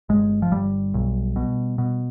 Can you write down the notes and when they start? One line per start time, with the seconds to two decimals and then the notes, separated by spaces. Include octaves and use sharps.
0.09 G1 G#3
0.42 F3
0.52 G1 G3
0.94 B1
1.36 B2
1.78 B2